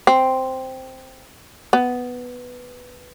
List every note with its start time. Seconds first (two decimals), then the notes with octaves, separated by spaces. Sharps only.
0.07 C4
1.73 B3